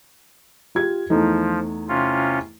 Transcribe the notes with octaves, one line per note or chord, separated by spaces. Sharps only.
F4 G4 G#6
E2 F3 A3 D#4
C3 C#4 F4